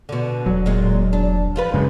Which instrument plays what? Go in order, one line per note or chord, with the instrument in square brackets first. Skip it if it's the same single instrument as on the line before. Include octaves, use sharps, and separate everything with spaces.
[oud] B2 D3
[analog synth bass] E1 [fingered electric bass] F#3
[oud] A#2 G#3
D4
F3 F4 B4
[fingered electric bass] F#2 C#3 [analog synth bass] G#3